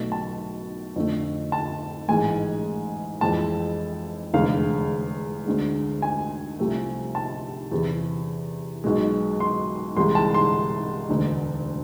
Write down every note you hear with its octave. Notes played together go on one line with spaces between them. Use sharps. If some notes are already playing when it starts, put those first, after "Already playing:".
Already playing: B1 B2 A3
A5
F2 D3 A3
A5
A1 G#2 E3 G#3 G#5
F2 E3 G#3 A5
F1 E2 D3 G#3 F5
D2 D3 G#3
G#5
C2 C3 F3 A3
A5
E2 C3 E3
B1 B2 G#3
C6
C2 C3 E3 G#3 C6
A5
C6
E1 D2 D3